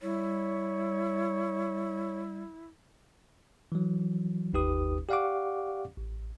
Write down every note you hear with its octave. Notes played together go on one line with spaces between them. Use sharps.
G3 E4 C#5
E3 F#3
G1 D#2 D#4 G4 B4 D#6
G4 D5 F5 F#5 C#6 D6
A1